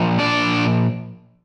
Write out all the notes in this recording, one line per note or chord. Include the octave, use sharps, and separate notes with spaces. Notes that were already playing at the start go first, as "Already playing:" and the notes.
Already playing: A#2 F3
D4 D5